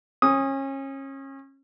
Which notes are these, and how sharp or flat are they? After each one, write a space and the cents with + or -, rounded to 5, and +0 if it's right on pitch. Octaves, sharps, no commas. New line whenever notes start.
C#4 -30 D#6 +0